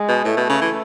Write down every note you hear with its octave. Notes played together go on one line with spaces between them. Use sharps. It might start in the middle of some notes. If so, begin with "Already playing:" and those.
Already playing: G#3
B2
A2 A3
B2
C#3
E3